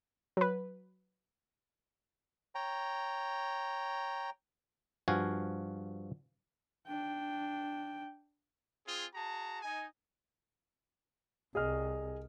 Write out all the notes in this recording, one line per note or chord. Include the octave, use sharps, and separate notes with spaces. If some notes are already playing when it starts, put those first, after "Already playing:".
F#3 B4
C#5 G5 A#5
G2 F3 F#4 F5 G#5
D4 G5
C4 F4 G#4
F#4 G#4 A5 A#5
D#4 G#5
C2 G#4 D#5 F6